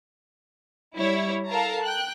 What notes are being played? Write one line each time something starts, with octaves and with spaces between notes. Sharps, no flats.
G3 E4 C#5
A4 A#4 F5 A5 A#5
G5 F#6